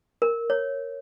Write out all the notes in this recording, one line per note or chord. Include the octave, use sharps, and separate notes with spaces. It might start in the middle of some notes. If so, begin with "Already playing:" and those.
A#4
C#5